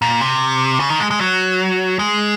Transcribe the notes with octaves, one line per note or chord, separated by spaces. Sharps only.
A#2
C3
C#3
D#3
G#3
G#3
F#3
G#3